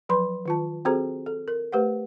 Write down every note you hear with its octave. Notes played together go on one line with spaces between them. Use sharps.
F3 F#3 B4 B5 C6
D#3 F4 A5
C4 F#4 G#4 A4 C5 A#5
A4
A#4
A3 G4 B4 C5 F#5